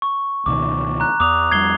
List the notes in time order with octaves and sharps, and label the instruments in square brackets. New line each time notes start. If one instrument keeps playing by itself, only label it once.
[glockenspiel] C#6
[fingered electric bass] C#2 B2 D#3 [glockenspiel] D6
[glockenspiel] A#5 F#6
[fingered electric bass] E2 [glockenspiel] D6 D#6 F7
[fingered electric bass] F2 G3 [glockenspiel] G#6 C7 G7